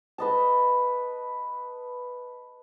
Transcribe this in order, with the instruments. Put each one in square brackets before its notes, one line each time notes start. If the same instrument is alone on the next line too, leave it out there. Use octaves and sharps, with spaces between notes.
[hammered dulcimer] B4 D#5 A5